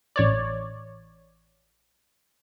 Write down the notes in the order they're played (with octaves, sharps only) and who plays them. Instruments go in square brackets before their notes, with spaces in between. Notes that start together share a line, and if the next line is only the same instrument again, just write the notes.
[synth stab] A1 C#5 D5